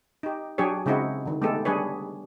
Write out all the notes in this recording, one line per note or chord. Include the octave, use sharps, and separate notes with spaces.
D#4 G4
F#3 D4 G4 G#4 C#5
C#3 G#3 C4 D#4 E4 F#4
D3 D#3
G#3 A3 B3 D#4 G4 A4
G3 D4 G#4 B4 C#5